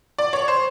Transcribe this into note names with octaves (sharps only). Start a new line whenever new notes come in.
D5
C#5
C5